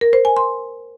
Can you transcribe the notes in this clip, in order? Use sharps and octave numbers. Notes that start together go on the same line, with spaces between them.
A#4
C5
G#5
C6